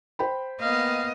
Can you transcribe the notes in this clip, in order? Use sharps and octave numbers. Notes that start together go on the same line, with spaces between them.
C5 G5 B5
A#3 B3 D#5 F5